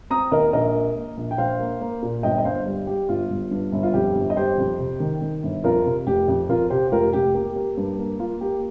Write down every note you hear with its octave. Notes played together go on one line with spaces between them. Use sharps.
C4 A#5 D#6
D#2 A#4 D#5
A#1 A#4 D#5
A#3
A#3
A#1
G5
A#1 C5 F5
A#3
A#3
A#2
G1 D#5 G5
D#5
G1 C5 F5
G3
G3 G4
G1 F4
G1
G2
G1
F4
F2 G4
G1
D#5
G1 G4 C5
F2
C3
D#3
D#3
G1
F2 F4 A#4
C3
F1 G4
F2
F2 F4 A#4
C3 G4 C5
G4
F1 F4 A#4
F1 G4
A#3 G4
A#3
G2
A#3
A#3 F4
A#3 G4